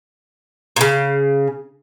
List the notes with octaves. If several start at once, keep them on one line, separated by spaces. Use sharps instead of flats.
A#2 C#3